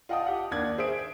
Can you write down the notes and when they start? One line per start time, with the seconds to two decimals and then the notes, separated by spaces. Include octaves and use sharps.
0.09 F4 D#5 F#5 G5 A5 D#6
0.26 G4 F#5
0.51 D#2 D4 G#6
0.78 G#4 C5 E5 D#6 D7